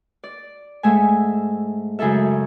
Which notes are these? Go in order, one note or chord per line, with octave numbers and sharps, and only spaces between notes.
D5
G#2 A3 E5 G#5
F#2 C#3 G#3 E4 A4 E5